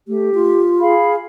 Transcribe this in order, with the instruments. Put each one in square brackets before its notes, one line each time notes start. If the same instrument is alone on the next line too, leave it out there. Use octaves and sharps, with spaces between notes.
[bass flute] A3 [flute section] G4
[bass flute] F4
[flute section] G#4 F5 B5